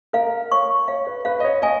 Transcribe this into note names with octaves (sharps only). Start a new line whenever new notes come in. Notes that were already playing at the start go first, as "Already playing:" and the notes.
A#4 F5
C#5 C#6
C#5 F5
B4
B4 F5
D#5
C#5
D#5 G#5